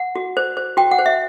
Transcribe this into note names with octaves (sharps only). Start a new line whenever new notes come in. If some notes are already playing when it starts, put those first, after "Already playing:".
Already playing: F#5
F#4
C5
C5
F#4 G5
F#5
C5
E5